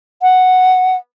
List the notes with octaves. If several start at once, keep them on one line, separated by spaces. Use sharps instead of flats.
F#5